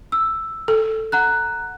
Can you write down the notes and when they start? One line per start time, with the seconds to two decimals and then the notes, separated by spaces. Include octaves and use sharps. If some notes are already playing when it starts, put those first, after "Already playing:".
0.12 E6
0.68 A4
1.12 F#5 A#5 F#6